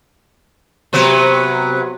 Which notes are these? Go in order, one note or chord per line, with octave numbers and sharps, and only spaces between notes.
C3 F#3 B3